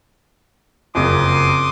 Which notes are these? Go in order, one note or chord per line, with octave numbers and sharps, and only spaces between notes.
F#1 F2 C6 D6 D#6